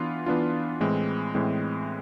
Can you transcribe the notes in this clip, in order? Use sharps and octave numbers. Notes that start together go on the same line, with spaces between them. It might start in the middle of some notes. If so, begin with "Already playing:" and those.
Already playing: E3 B3 D4 F4
E3 B3 D4 F4
A2 E3 G#3 C4
A2 E3 G#3 C4